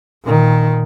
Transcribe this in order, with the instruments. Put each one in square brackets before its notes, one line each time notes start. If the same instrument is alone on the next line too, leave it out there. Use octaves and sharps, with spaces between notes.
[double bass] A#2 D#3